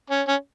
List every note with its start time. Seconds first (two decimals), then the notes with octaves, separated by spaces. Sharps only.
0.10 C#4
0.27 C#4